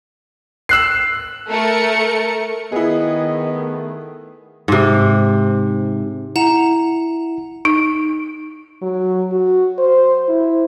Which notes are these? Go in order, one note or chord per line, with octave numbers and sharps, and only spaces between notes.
E6 F#6 C7
A3 A#4 C#7
D#3 B3 E4 G#4 D#5
A3
G#2 C3
E4 F#5 A#5 E7
D#4
F#3
F#4
C5
E4